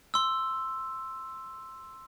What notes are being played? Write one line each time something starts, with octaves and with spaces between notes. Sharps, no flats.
C6 E6